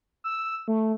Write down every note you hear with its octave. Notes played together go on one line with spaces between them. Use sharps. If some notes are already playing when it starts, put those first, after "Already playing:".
E6
A3